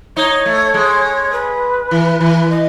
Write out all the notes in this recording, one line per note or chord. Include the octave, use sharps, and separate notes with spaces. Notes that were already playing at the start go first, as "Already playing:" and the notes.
D#4 C#5
A3
G#3
B4
E3
E3
D#5